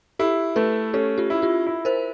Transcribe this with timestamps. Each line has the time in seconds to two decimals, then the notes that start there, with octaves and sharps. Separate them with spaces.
0.19 E4 G4 A4
0.56 A3 A4 B4
0.94 C#4 G4 A4
1.18 F4 G4
1.30 E4
1.42 F4 G4
1.67 E4
1.85 A#4 C5